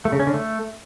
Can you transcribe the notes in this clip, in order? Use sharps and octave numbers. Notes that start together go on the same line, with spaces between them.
A3
C#3
C#4
D3
A3